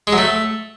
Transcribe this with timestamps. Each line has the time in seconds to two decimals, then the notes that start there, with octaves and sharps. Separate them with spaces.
0.07 G#3
0.13 F#3
0.18 A3